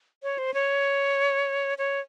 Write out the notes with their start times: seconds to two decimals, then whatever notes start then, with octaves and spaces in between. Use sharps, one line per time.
0.23 C#5
0.38 C5
0.54 C#5
1.78 C#5